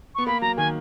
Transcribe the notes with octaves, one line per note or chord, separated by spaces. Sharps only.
B3 C#6
A#3 B5
F#3 A#5
D#3 G#5